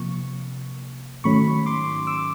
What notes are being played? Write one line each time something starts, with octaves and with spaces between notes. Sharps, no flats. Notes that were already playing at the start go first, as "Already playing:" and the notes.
Already playing: C3 F3 A#3 C#6
G#2 D#3 F#3 A3 C#4 B5 C#6
C6 D6
D6 E6